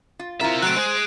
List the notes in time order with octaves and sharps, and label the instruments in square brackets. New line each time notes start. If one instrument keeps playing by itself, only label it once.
[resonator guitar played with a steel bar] F4
[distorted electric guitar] C4 E5 [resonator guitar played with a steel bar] E4 F4 A#4
[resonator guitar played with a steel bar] F#3 A3 [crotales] F#6 D7
[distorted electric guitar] G#3 G#4 [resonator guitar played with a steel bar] C5